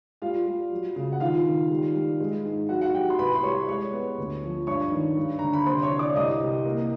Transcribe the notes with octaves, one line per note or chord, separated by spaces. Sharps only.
G3 F4 F5
G3
F#3
C#3
F#5
D#3 F4 F5
D#3
G3
G3
G#3
G#2
F#3 F#4 F#5
F#4 F#5
F#3 G4 G5
C6
C2 B4 B5
C6
G3 C#5 C#6
G#3 C#5 C#6
B3
D2
F3
G2 C#5 C#6
D#3
G2
D3 A#5
B5
C3 C5 C6
C#5 C#6
E3
D5 D6
C2 D#5 D#6
C3
A#3